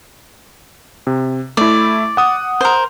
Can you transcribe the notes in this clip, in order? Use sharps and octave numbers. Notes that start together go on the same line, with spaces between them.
C3
A3 E4 D5
F#5 D#6
A#4 C5